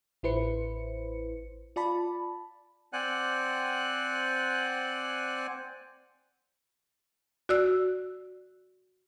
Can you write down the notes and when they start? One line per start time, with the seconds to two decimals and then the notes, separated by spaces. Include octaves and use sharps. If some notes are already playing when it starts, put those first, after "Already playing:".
0.23 A1 E4 B4 C5 C#7
1.76 F4 D5 A5 B5
2.93 C4 C5 D5 F#5 G#5 F#6
7.49 F#4 D5 E6 F#6